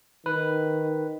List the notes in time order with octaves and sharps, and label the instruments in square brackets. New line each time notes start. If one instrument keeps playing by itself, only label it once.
[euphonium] D#3 [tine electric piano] B4